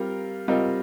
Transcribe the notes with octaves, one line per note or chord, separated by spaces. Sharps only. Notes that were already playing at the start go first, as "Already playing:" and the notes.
Already playing: G3 C4 F4 A#4
G3 C4 F4 A#4 D#5